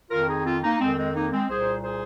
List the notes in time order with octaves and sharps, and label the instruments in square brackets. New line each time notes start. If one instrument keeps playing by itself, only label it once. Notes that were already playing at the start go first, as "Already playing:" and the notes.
[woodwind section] F2 D#3 F4 A#4
D#4 G#4
C4 F4
A#3 D#4
F2 D#3 G#3 C4
G#3 C4
A#3 D#4
G#3 C4
C2 A#2 G#4 C5
G#4 C5